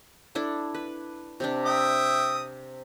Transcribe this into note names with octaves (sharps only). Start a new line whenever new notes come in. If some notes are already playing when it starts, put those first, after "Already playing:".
D4 E4 A4
B4
C3 C4 D4
E5 G5 D#6